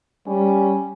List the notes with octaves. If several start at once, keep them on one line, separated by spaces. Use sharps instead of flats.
G3 C#4